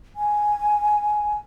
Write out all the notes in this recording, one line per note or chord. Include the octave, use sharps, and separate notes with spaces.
G#5